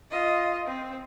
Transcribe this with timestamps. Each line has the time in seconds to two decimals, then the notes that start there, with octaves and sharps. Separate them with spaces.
0.11 F4 D#5
0.67 C4